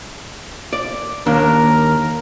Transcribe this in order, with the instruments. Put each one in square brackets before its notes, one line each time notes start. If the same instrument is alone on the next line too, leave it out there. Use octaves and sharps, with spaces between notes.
[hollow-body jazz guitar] D5
[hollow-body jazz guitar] D#2 D4 [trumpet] A#4